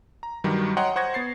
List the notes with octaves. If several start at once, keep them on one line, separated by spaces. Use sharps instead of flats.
A#5
G2 D#3 F#3 G3
C#5 D#5 F#5 G5 A#5 C6
C5 F#5 C#6 D#6 G#6 A#6
B3 A6 C7